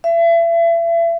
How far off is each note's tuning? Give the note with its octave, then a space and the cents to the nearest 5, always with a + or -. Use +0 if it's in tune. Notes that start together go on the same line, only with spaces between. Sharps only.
E5 +35